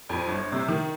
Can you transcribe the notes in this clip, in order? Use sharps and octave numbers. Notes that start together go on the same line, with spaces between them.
F2
G1
C3
D#3